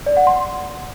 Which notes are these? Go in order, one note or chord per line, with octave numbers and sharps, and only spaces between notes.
D5
F#5
C6